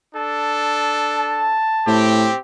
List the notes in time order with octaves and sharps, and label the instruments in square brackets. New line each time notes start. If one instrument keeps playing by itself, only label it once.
[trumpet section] D4 A4
[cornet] A5
[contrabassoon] A2 [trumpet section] C4 G4